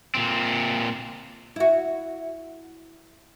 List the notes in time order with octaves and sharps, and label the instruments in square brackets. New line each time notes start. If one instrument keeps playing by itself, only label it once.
[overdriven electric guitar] A#2 C4
[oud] E4 F#4